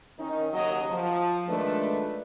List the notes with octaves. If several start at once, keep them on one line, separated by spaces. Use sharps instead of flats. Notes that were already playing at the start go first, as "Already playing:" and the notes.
D#3 C#4 D#4
D#2 C#3 F#3 D#5
F3
D#3 G#3 A3 D4 F4 B4